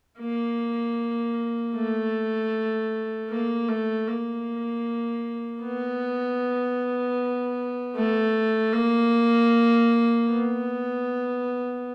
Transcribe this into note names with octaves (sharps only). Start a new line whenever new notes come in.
A#3
A3
A#3
A3
A#3
B3
A3
A#3
B3